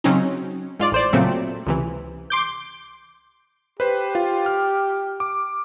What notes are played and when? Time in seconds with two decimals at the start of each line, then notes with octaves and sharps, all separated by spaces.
0.04 C#3 F#3 C4 C#4 D#4
0.80 G#2 F4 D5
0.92 A1 C5 D5
1.13 A#2 C#3 F#3 A3 C4
1.67 C#2 C3 E3
2.30 C6 D6 G6
3.80 G4 B4 C5
4.15 F4
4.46 F6
5.20 D6